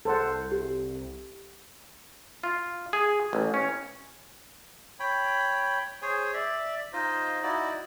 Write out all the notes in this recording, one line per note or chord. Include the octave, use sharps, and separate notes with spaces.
C2 A4 C5 F#5
G4
F4
G#4
A1
C#4
C#5 G5 B5
G#4 C5 C#5 G#5
D5 E5
D#4 F4 C5 D#5
D#4 E4 F#4 D5